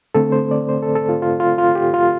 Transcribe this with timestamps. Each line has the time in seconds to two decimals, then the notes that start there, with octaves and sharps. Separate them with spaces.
0.15 D3 A3 C4 A4
0.32 C5
0.51 D5
0.69 C5
0.83 A4
0.95 A4
1.09 F4
1.22 F4
1.40 F4
1.58 F4
1.75 G4
1.94 F4